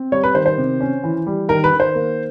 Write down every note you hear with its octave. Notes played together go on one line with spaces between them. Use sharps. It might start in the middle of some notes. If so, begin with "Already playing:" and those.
Already playing: C4
G3 C#5
B4
D#3 C5
C5
C3
C#4
E3
G3
D#3 A#4
B4
D#3
C5
A#3